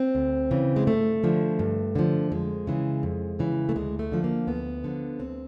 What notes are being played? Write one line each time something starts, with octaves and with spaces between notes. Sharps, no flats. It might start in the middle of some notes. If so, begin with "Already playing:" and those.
Already playing: C4
D2
C#3 E3
G#3
G2 A3
D3 F3
G2
D3 F3
F2 G#3
C#3 E3
F2
C#3 E3
A3
D2 G#3
A3
D3 F3
A#3
D2 B3
D3 F3
D2 C4